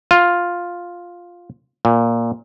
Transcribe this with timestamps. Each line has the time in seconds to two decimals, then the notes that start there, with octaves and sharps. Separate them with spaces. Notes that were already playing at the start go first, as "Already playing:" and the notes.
0.11 F4
1.85 A#2